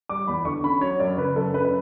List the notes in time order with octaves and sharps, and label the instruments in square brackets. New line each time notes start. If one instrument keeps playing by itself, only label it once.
[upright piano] G3 D6
E2 B5
D3 C#6
C#4 B5
F#3 C#5
F#2 D5
C#3 B4
F#2 A4
C#4 B4
B4